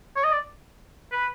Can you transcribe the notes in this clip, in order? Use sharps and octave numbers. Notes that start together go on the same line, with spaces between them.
C#5
D#5
D5
B4